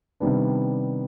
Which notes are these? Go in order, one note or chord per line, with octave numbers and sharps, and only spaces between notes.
C3 D#3 G3 B3 D4